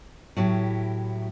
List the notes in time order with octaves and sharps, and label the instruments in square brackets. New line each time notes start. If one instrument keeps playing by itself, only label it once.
[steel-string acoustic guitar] A2 F#3 E4 G4